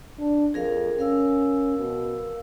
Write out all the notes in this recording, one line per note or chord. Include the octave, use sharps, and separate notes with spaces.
D4
F2 G#4 A#4 F5
C#4 A#4 F5 E6
B2